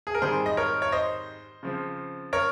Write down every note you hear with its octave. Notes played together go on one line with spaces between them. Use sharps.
G#4
A#4
G#2 D#3 G3 C4 G#4 C5
D#5
A#4 C#5
C#5
C5 D#5
C#3 F3 C4
A#4 C#5